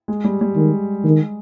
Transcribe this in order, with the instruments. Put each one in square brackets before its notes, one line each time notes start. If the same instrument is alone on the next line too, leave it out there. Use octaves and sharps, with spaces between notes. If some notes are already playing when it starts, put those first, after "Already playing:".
[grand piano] G#3
G3
G3
[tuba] D#3 [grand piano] G#3
[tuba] D#3 [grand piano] G#3